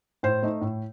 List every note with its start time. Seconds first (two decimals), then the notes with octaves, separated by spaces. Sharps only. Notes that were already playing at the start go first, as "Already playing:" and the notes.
0.23 A2 C5
0.43 A3 D#4
0.61 A2